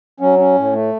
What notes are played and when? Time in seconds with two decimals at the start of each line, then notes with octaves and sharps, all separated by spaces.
0.20 F#3 C#4
0.39 C#4
0.55 A2
0.73 A3